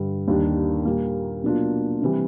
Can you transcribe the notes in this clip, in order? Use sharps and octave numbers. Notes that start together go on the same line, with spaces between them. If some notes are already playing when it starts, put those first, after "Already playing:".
Already playing: G2 D3 G3
D#2 D#3 G3 A#3 D4
A#2 G3 A#3
B2 F#3 A#3 D4 F4
C3 E3 G3